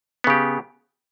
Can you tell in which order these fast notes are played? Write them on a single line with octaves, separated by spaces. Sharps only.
B3 C#3 G4